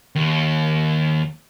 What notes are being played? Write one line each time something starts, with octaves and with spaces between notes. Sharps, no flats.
D#2